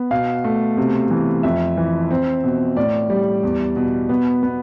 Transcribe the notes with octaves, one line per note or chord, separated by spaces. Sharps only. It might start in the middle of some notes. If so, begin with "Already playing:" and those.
Already playing: B3
B2 F5
A3
C3
E3
F2 E5
E3
C4
B2
A2 D5
G3
E2
B2
B3
B3